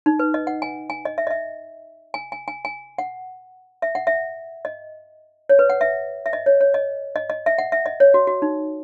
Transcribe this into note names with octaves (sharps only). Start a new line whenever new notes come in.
D#4
B4
D#5
F#5
G#5
G#5
D#5
E5
D#5
E5
G#5
G#5
G#5
G#5
F#5
E5
F#5
E5
D#5
C#5
B4
F#5
E5
E5
D#5
C#5
C#5
D#5
D#5
D#5
E5
F#5
E5
D#5
C#5
F#4
F#4
D#4